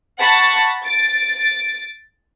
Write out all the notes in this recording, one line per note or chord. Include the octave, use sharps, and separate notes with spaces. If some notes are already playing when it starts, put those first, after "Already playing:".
F#5 A5 B5 C#6
A6 D7